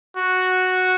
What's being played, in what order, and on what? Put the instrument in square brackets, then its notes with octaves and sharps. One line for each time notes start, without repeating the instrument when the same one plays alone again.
[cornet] F#4